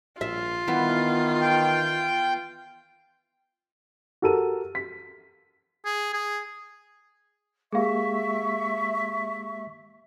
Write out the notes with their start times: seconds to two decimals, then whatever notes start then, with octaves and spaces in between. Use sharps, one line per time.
0.21 A#1 F4 E5
0.68 D#3 E3 B3
1.41 G5
4.22 F#4 G4 A4 A#4 D#7
4.75 B6
5.85 G#4
6.13 G#4
7.73 G#3 A#3 G4 G#4 E5 F5 C#6